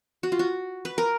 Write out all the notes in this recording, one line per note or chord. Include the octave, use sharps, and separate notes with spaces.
F#4
F4
F#4
B4
A#4